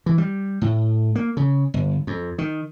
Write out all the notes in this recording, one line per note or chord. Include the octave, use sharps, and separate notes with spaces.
E3
G3
A2
A#3
C#3
G1
F2
D#3